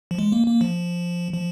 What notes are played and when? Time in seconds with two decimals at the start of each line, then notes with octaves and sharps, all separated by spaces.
0.11 F3
0.18 G#3
0.32 A#3
0.47 A#3
0.61 F3
1.33 F3